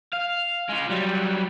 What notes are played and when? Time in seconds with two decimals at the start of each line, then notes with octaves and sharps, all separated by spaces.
0.13 F5
0.69 G#3 F4
0.90 F#3 G3